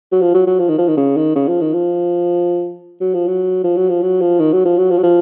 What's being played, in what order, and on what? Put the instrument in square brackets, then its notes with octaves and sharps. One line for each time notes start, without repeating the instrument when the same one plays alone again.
[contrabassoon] F#3
F3
F#3
F#3
F3
D#3
F3
D#3
C#3
D#3
C#3
F3
D#3
F3
F#3
F3
F#3
F3
F#3
F3
F#3
F3
D#3
F#3
F3
F#3
F3
F#3
F3